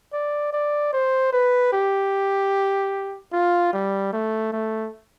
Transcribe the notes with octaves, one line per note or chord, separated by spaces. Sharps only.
D5
D5
C5
B4
G4
F4
G3
A3
A3